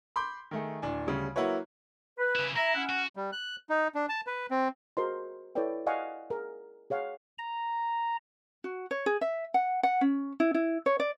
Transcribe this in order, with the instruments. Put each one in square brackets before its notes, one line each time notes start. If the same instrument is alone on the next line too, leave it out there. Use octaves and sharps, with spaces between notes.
[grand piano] B5 C6 D6 G6
D#3 A3 G#4
D1 D4 G#5
D2 C#3 G3
F#3 A#3 E4 F#4 B4 C#5
[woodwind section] B4
[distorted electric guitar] C#3 E4
[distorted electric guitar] E4 [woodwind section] E5 A#5
[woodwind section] C#4 F#5
[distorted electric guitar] F#4
[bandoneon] G3
F#6
D#4
D4
A5
B4
C4
[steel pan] F#4 G#4 A#4 C5 D#5 C6
E4 A4 B4 C#5 D5 G5
D5 D#5 F5 F#5 G#5 C#6
G#4 A#4
G#4 C#5 F5 F#5
[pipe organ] A#5
[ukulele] F#4
C#5
G#4
E5
F#5
F#5
C#4
E4
E4
C#5
D5